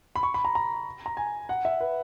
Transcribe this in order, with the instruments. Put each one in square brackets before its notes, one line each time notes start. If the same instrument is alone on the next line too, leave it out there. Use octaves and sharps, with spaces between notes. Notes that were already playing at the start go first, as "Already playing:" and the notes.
[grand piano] B5
C#6
B5
A#5
A#5
A#5
G#5
F#5
E5
B4